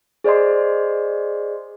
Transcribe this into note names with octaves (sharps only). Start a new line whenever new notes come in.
G#4 C5 D5 D#5 C6